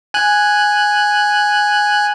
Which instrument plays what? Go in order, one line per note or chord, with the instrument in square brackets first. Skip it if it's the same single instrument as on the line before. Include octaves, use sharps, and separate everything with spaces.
[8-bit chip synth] G#5 F#6